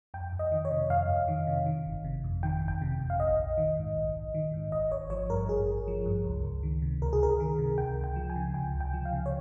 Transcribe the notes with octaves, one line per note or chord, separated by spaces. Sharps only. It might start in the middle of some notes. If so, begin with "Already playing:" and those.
F2 G5
F2
D#5
D#3
C#5
C3
F2 F5
F2
D#3
C3
D#3
G1
C3
F2
D#3 G5
G1
G5
C3
F2
F5
A#1 D#5
A#1
D#3
G#2
A#1
A#1
D#3
G#2
G#1 D#5
G#1 C#5
F3 C#5
G2 A#4
G#1 G#4
G#1
F3
G2
C#2
C#2
D#3
C3
C#2 A#4
G#4
C#2 A#4
D#3
C3
C#2 G5
C#2
G5
F3
G#5
C#3
C#2 G5
C#2
G5
F3
F5
C#3
C#5